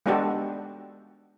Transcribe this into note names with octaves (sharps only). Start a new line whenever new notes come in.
G#3 B3 D4 F#4 G4 A4